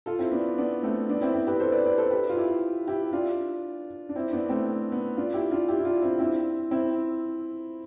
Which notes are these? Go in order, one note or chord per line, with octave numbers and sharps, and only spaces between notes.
F4 A4
C4 E4
B3 D4
B3 D4
A3 C4
B3 D4
C4 E4
C4 E4
G4 B4
A4 C5
B4 D5
B4 D5
A4 C5
G4 B4
F4
E4 G4
E4 G4
D4 F4
D4
C4 E4
B3 D4
A3 C4
B3
D4 F4
E4 G4
D4 F4
E4 G4
E4
D4 F4
C4 E4
C4 E4
C4 E4